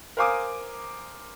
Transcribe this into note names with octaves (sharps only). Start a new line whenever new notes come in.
A#4 C5 F5 G#5 D6 D#6